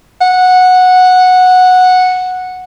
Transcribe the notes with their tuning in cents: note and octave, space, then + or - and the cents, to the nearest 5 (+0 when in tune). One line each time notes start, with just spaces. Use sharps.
F#5 -10